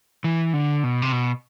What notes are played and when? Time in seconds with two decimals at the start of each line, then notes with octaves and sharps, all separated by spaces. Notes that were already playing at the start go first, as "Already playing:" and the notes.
0.24 E3
0.53 D3
0.84 B2
1.02 C3
1.12 B2